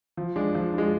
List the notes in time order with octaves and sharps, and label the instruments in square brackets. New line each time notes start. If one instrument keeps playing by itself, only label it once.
[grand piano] F3
G#3 D4
F3
G#3 D4